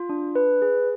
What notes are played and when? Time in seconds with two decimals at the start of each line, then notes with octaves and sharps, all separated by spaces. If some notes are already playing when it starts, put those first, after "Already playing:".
Already playing: F4
0.09 D4
0.35 B4
0.62 G#4